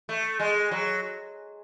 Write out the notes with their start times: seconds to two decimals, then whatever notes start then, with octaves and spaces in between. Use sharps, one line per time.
0.09 A3
0.40 G#3
0.71 F#3